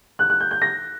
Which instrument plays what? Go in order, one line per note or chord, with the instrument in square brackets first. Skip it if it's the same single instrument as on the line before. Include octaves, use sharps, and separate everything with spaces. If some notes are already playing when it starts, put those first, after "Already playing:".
[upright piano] F#6
F#6
G6
G6
A#6